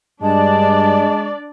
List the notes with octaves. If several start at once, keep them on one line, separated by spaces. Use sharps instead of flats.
G2 G#3 D4 D5 A5